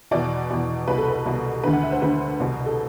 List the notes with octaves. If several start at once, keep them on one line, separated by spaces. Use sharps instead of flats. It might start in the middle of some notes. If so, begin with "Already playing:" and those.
E2 B2 D5
E2 B2
C2 B2 B4
A4
B4
C2 B2
D2 D3 B4
F#5
E5
C5
D2 D3 B4
C2 B2
A4